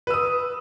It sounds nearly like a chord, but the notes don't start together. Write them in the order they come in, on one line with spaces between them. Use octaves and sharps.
B4 E6 D#6